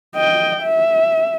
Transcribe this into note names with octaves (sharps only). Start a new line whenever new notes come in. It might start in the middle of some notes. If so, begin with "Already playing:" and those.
D#5 G5
E5